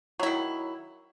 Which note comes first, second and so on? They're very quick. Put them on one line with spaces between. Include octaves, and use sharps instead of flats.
F#3 E4 D#3